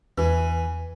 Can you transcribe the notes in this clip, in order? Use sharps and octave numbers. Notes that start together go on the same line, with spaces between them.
E2 E3 B4 G#5